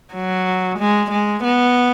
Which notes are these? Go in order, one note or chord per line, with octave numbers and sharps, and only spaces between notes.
F#3
G#3
G#3
B3